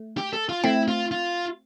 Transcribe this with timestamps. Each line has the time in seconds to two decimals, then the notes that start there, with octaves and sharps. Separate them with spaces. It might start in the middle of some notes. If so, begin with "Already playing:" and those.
Already playing: A3
0.17 G4
0.33 A4
0.49 F4
0.64 A3 C4 E4
0.88 F4
1.11 F4